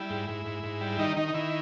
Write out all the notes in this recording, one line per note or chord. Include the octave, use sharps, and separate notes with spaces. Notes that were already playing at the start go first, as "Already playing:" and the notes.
Already playing: G3 E4
G#2
G#2
G#2
G#2
G3
D#3 D#4
D#3 D#4
D#4
D#3 E4